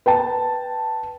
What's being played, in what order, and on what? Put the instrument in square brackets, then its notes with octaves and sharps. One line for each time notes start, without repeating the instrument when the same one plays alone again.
[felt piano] B4 G5 A5